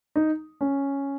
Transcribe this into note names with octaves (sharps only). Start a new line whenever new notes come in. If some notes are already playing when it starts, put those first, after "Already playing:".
D#4
C#4